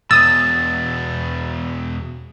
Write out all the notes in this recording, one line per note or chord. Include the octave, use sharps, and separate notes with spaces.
E2 B2 D#6 E6 A6